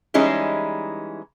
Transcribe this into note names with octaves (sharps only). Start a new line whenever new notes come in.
E3 G3 G#3 C#4 D#4 E4